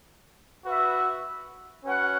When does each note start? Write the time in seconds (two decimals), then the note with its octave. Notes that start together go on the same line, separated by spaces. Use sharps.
0.64 F#4 B4 E5
1.85 C#4 F#4 B4 F#5